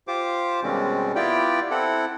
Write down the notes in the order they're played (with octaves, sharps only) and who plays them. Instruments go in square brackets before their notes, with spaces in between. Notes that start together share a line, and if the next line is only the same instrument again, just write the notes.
[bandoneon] F4 G4 C5 D6
B2 D#3 G3 G#3 C4 C#4
B3 E4 F4 G4 D5 G5
C4 E4 A4 F#5